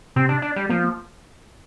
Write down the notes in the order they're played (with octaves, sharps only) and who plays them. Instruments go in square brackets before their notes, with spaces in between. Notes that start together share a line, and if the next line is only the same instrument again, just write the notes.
[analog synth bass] C3 [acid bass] C4
[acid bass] D4
D4
G3
[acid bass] F3 [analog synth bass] A#3